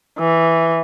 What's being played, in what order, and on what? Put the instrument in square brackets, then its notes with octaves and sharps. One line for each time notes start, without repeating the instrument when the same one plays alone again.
[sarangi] E3